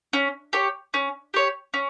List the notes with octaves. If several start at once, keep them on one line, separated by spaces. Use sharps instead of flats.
C#4
G4 C#5
C#4
G4 C#5
C#4